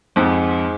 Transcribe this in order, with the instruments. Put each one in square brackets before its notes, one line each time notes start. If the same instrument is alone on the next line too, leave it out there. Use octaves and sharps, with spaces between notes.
[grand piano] F2 [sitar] G#2